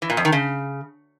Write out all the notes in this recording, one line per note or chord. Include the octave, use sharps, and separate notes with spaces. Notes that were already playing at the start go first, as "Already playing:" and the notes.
E3
A#2
F2
D#3
C#3